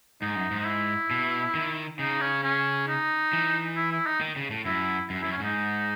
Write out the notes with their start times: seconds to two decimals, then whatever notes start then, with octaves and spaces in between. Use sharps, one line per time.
0.21 G#2 D#4
0.36 F#2
0.51 G#2
0.59 D#4
0.66 E4
1.11 B2
1.55 D#3
1.99 C#3 D#4
2.21 C#4
2.43 C#4
2.88 D#4
3.33 E3
3.76 E4
3.92 E4
4.06 D#4
4.21 D#3
4.36 C#3
4.51 A2
4.65 F#2 E4
5.10 F#2
5.21 F#2 E4
5.32 C#4
5.40 G#2 D#4